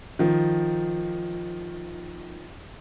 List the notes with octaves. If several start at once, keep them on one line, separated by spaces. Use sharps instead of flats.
D#3 F3